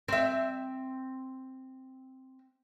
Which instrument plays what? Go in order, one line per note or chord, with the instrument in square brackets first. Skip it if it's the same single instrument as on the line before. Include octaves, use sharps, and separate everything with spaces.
[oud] C4 E5